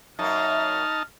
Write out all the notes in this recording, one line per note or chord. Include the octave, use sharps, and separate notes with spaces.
F#2 A#3 D#4 A5 F6